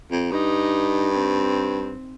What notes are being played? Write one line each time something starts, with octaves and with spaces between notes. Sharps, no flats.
F2
G2 D#4
C4